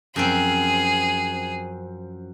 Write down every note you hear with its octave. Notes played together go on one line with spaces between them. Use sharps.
F#2 F3 C4 G#4